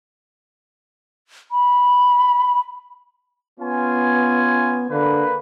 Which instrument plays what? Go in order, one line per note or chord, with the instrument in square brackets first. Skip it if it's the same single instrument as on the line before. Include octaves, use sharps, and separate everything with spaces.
[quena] B5
[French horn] B3 [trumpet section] C#4 F4 G#5
[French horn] D3 [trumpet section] A#3 B4